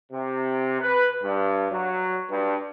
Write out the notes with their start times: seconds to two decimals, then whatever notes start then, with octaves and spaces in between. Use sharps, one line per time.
0.13 C3
0.81 B4
1.22 G2
1.72 F#3
2.30 G2